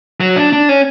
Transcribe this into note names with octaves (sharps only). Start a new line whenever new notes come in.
F#3
D4
D4
C#4